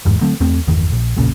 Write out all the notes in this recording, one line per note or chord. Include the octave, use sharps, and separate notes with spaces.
G1 E2 G#2
D3 F#3 A3 C4
E2 A3 C4
G1 E2 D#3
A#1
E1 A#1 A#2 C#3